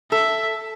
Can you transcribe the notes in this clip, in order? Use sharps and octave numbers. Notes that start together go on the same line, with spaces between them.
A4 E5